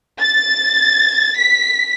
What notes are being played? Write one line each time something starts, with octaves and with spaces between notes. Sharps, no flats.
A6
B6